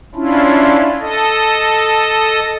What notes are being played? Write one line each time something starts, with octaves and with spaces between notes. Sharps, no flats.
C#4 D4 E4 F4
A4 D#5